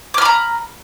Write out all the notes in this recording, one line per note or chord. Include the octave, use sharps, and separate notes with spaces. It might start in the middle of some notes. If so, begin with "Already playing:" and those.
A#5 B5 D6 F6